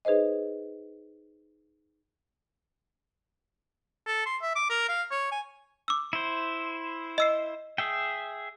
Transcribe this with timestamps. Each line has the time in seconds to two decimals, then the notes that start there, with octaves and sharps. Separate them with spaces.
0.05 D#4 G#4 B4 C5 D#5
4.07 A4
4.26 C6
4.42 E5
4.56 D6
4.70 A#4
4.89 F5
5.11 C#5
5.32 G#5
5.88 D6 E6
6.13 E4 C5
7.18 D#5 E6 C7
7.78 G#4 E5 G5